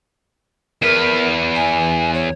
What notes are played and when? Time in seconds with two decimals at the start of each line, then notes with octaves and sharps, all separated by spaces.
0.82 E2 A#4 B4
1.56 G#5
2.14 C#5